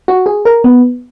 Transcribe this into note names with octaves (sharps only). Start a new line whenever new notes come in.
F#4
G#4
A#4
B3